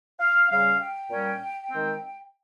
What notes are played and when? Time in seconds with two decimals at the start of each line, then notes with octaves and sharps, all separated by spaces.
0.20 F5
0.50 C#3 G3 C#4 F5
0.80 G5
1.10 A#2 G3 C#4
1.71 D#3 G#3 C4